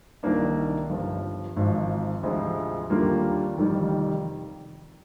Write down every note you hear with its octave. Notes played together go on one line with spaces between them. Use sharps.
C2 C3 D#3 A#3 D4
G1 G2 F3
G#1 G#2 F3
D2 C3 F3 G#3 C4
D#2 D3 G3 A#3 F4
F1 F2 D#3 G3